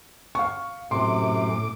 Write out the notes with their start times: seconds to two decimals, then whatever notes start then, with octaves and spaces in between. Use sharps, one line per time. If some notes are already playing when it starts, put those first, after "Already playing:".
0.35 F5 C#6
0.91 F#2 A2 C3 C6 D6